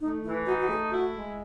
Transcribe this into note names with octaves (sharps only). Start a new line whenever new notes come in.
A3 D#4
E3 E4
D#4 F#4
F#4
A3 G#4
E4 F#4
G#3